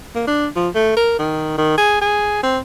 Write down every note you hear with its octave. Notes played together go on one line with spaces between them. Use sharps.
A#3
D4
F3
A3
A#4
D#3
D#3
G#4
G#4
C4